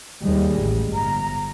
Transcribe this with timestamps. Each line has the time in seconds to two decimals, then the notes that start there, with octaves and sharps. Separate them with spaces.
0.24 D#2 G3 G#3
0.63 A1
0.94 G1 A#5